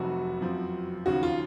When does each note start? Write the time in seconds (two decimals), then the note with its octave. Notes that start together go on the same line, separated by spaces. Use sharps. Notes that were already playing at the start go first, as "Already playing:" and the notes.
Already playing: F1 F2 C3 F#3 F#4
0.41 F#2 F3 C4
1.06 D#2 C#3 F3 F#4
1.23 F4